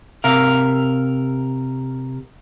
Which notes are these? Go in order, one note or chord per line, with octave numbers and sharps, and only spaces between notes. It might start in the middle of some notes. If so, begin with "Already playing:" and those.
C3 A#4 F5